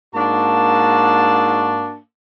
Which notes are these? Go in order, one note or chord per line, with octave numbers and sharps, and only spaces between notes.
G#2 A#3 D4 F#4 A5